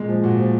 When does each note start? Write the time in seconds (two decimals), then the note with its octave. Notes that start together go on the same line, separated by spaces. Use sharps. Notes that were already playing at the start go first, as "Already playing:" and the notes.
Already playing: A#2 G#3
0.09 F3
0.23 A#2 F#4
0.39 F3